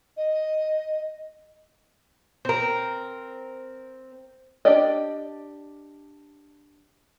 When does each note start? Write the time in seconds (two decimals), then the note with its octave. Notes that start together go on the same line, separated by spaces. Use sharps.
0.17 D#5
2.45 C4 A#4
4.65 D4 G4 D5 D#5